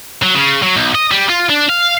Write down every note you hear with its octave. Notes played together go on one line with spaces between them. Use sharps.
F#3
C#3
F#3
B1
D#5
G3
F4
D4
F5